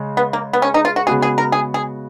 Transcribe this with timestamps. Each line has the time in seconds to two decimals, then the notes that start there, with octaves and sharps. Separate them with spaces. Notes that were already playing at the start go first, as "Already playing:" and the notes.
Already playing: C#3 G#3
0.17 B3
0.33 A#3
0.53 B3
0.62 C#4
0.74 D#4
0.85 F4
0.96 F#4
1.07 C#3 G#3 B3 F#4 G#4
1.22 G#4
1.38 A#4
1.52 G#4
1.74 G#4